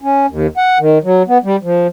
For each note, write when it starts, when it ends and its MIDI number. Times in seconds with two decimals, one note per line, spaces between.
0.02 0.26 61
0.30 0.47 39
0.57 0.78 78
0.79 0.98 51
1.04 1.23 54
1.28 1.38 59
1.44 1.56 55
1.63 1.87 53